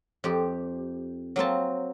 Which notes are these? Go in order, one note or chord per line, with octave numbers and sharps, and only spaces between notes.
F2 G4
F#3 A#3 C4 A5